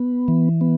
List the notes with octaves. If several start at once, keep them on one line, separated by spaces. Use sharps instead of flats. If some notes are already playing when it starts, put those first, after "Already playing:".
Already playing: B3
E3
B3